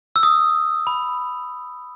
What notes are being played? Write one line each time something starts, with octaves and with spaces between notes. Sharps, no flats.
E6
D#6
B5